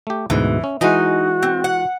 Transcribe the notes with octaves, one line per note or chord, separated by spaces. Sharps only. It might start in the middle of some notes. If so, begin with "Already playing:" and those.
A3 G4
D2 G#2 B2 E3
C#4
E3 G#3 D#4 F#4 G#5
C4
F#5